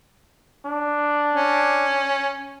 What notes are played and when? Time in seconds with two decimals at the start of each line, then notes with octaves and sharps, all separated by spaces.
0.65 D4
1.34 C#4